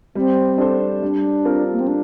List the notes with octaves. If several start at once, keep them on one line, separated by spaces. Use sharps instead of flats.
G3 C4
D4 A4 C5
G3 D4
C4 F4 A#4
A#3
C4
D4